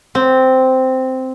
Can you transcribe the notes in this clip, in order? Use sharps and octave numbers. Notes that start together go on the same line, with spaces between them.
C4